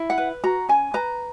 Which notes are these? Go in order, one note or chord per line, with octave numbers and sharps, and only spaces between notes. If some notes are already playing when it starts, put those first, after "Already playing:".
Already playing: E4
F#5
B4
F#4 A#5
C#4 G#5
B4 A#5